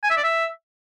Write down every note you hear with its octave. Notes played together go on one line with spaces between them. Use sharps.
G#5
E5
D5
E5